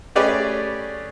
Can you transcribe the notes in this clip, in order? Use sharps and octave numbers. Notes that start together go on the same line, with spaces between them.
A3 C#4 G4 G#4 B4 D5